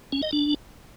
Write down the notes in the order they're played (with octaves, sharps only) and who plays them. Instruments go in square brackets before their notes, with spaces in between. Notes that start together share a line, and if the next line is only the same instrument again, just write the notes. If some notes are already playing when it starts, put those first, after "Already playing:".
[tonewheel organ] C#4
D#5
D4